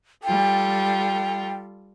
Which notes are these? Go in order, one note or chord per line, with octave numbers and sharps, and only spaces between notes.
G3 F4 A4 G5